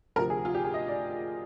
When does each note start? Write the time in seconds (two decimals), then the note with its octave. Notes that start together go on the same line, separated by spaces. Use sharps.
0.16 D2 C3 F3 A#4
0.30 G#4
0.45 F4
0.55 G4
0.64 G#4
0.74 D#5
0.88 D5